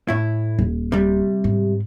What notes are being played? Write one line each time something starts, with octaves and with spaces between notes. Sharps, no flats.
A2 E4
D#1
C3 G3
G#2